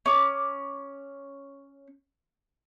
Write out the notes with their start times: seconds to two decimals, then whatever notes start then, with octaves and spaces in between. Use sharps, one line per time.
0.06 C#4 D6